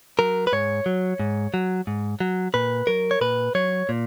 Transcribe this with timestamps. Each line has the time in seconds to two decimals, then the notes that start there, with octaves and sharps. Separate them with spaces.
0.19 F#3 A#4
0.47 B4
0.53 G#2 C#5
0.86 F#3
1.20 G#2
1.54 F#3
1.87 G#2
2.20 F#3
2.54 A#2 B4
2.87 F#3 A#4
3.11 C#5
3.21 A#2 B4
3.55 F#3 C#5
3.89 A#2